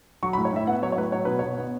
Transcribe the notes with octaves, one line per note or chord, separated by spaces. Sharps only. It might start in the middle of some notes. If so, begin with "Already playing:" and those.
F#3 C#6
B5
A2
C#5
A2 E5
B3 F#5
F#3 C#5
C#5
A2 B4
F#3 C#5
B2 B4
B2 C#5
B3